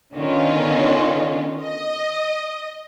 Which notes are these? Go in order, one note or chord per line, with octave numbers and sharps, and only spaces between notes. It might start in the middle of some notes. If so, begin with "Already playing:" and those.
D3 D#3 B3 C#4 F4
D#5